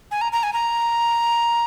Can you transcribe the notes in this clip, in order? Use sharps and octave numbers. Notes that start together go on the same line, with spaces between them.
G#5
A#5
A#5
G#5
A#5